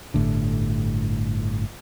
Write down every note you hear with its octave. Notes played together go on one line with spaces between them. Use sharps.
G1 A2 D3